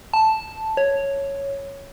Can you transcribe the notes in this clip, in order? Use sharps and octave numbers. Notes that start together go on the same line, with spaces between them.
A5
C#5